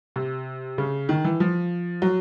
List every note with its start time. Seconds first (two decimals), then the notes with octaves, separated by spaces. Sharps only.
0.16 C3
0.78 C#3
1.09 D#3
1.24 E3
1.40 F3
2.02 F#3